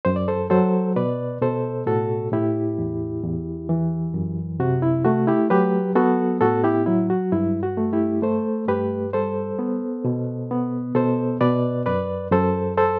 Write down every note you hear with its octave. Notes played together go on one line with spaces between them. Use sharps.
F#2 C5
D5
A4 C5
F#3 A4 C5
B2 B4 D5
B2 A4 C5
A2 F#4 A4
A2 E4 G4
E2
E2
E3
F#2
C3 F#4
E4
A3 F#4
E4 G4
F#3 G4 B4
B3 F#4 A4
A2 F#4 A4
E4 G4
F#3 E4
F#4
G2 E4
F#4
A3
E4 G4
A3 A4 C5
G2 G4 B4
G3 A4 C5
B3
B2
B3
B2 A4 C5
B2 B4 D5
F#2 B4 D5
F#2 A4 C5
A4 C5